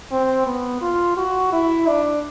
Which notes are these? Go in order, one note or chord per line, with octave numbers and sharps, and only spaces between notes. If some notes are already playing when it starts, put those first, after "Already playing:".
C4
B3
F4
F#4
E4
D4